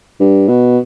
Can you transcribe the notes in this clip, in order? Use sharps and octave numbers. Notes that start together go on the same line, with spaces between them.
G2
B2